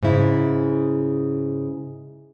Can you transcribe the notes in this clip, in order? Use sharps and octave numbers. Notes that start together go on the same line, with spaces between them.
G#2 C#3 E4